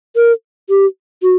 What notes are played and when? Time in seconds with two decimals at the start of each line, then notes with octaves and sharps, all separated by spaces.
0.16 A#4
0.69 G4
1.23 F#4